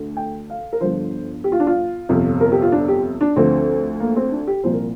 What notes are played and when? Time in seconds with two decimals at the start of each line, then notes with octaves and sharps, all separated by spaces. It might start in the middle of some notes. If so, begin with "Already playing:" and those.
Already playing: D2 D3
0.17 G5
0.50 F5
0.73 A#4
0.80 G1 G2 D3 F3 C5
1.44 G4
1.52 F4
1.60 D4
1.67 F4
2.09 G1 F2 C3
2.41 A#4
2.52 G4
2.62 F4
2.72 D4
2.88 G4
3.21 D4
3.36 D2 D3 F3 C4
4.00 A#3
4.16 C4
4.32 D4
4.47 G4
4.64 C2 A#2 F3 C5
4.73 A#4